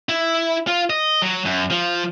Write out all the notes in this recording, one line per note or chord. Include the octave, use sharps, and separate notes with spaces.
E4
F4
D#5
F#3
F#2
F3